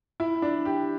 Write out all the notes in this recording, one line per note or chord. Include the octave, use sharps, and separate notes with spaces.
E4
D4
G4